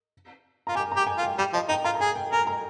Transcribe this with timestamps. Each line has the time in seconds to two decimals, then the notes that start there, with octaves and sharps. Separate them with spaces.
0.67 F4 A#5
0.75 G4 G#5
0.92 A#5
0.96 G4
1.07 G#5
1.18 F4
1.23 G5
1.38 G3 G5
1.53 F3 D#5
1.69 D#4 G5
1.84 F4 A#5
1.95 A#5
2.01 G#4 G#5
2.16 G5
2.32 A#4 G#5
2.47 A#5